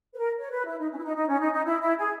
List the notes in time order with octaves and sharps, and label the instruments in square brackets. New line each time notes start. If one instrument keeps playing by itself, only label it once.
[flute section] B4
A#4
C#5
B4
E4
D#4
C#4
E4
D#4
D#4
C#4
D#4
D#4
E4
E4
G#4